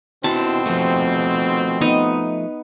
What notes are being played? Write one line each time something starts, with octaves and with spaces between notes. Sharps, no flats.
D#2 B2 C4 E4 F#4 A5
F3 A3
B3 D#4 D#5